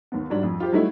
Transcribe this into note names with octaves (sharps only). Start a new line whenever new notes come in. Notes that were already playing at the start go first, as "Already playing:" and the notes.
D#2 B3
G#2 F#3 G3 D4
F2
F4 G4 C5
F#3 G3 A3 D#4 E4